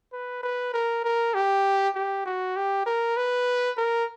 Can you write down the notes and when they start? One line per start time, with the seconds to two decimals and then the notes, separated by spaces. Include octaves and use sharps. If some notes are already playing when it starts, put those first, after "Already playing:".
0.13 B4
0.43 B4
0.73 A#4
1.04 A#4
1.34 G4
1.95 G4
2.26 F#4
2.56 G4
2.86 A#4
3.17 B4
3.77 A#4